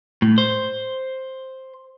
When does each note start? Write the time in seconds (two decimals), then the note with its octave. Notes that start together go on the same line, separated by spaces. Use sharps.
0.22 A2
0.38 C5